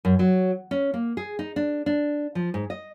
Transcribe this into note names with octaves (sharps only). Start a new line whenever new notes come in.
F#2
F#3
C#4
A#3
G#4
D#4
D4
D4
F3
G#2
D#5